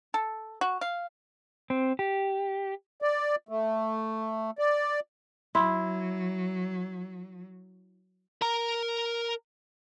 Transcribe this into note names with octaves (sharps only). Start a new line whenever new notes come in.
A4
F#4
F5
C4
G4
D5
A3
D5
F#3 E4 C6
A#4 A#5